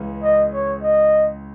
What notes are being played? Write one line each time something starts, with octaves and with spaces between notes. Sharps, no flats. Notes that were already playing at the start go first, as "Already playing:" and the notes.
Already playing: C#2 C#3 E3
D#5
C#5
D#5